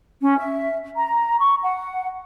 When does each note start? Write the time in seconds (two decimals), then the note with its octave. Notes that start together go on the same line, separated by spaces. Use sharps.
0.21 C#4
0.39 E5
0.96 A#5
1.41 C#6
1.63 F#5